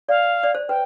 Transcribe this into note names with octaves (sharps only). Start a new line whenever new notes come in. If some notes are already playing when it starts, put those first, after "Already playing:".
D5 F5
D5
C5
B4 G5